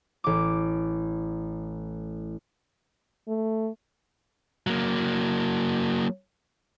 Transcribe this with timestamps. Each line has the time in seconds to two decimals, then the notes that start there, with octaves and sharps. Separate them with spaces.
0.24 A1 D6
3.28 A3
4.67 F#3 A#3